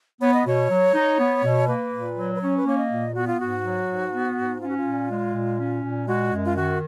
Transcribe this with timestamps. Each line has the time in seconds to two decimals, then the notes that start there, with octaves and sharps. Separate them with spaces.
0.21 B3 C#5
0.34 D#5
0.46 B2 C#5
0.70 F#3
0.94 D#4
1.18 B3
1.43 B2
1.68 A#3 B4
1.92 A#2
2.16 F#3
2.35 B4
2.41 C#4 C#5
2.57 B4
2.65 A#3 C#5
2.78 D#5
2.90 A#2
3.14 B3 F#4
3.27 F4
3.39 G#2 F#4
3.63 F#3
3.87 G#2
4.12 B3
4.37 G#2
4.61 C#4 F4
4.69 F#4
4.77 F4
4.85 A#2
5.10 G#3
5.34 A#2
5.59 C#4
5.84 A#2
6.07 G#3 F#4
6.32 F#2
6.45 F4
6.56 D#3 F#4